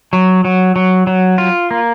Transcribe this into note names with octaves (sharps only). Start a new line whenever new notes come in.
F#3
F#3
F#3
F#3
F4
A#3